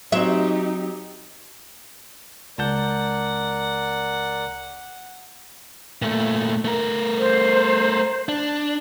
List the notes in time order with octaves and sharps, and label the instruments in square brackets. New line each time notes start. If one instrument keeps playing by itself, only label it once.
[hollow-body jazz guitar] F#3 C4 [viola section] D#4 G4 [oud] E5
[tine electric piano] C#2 A5 G6 [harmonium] A#4 D5 [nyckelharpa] F#5
[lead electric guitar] A#2 A3
A3 A#4
[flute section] C5
[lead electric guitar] D4